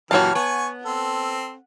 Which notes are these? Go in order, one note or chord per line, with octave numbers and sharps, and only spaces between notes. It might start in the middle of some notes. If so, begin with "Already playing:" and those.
F#2 A#2 E3 F#4 G4 C#5 A5 F6
B3 G#5 C#6
C4 A4